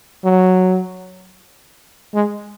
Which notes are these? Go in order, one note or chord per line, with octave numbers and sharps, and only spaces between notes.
F#3
G#3